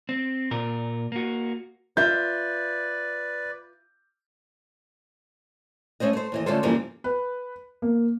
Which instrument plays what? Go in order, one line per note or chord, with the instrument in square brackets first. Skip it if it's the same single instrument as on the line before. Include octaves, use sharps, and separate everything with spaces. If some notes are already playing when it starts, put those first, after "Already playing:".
[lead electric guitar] C4
A#2 A#4
A#3 F#4
[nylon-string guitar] F4 E5 [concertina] B4 D5 [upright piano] G6
[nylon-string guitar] A3 C#4 C5 D#5
A3 C5
D#2 E3 D#5
D3 A3 C#4 F4 A4 C5
G2 C#3 E3 F3 G3 A#3
[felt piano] B4
A#3